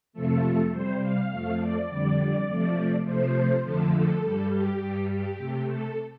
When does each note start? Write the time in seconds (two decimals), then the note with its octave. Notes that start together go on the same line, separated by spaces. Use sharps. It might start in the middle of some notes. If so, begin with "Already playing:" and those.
0.13 F2 C3 F3 A3 A4
0.71 C3 G3 C5
1.02 F5
1.30 F2 F3 A3
1.60 D5
1.88 F2 D3 G3 D5
2.47 C3 F3 A3
3.05 C3 F3 A3 C5
3.62 F2 D3 F3 A3 A4
3.93 A4
4.21 G2 G3
4.50 G4
4.80 G2 G3
5.09 G4
5.37 C3 A3
5.67 A4